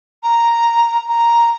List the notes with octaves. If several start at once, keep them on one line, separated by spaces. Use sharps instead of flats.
A#5
A#5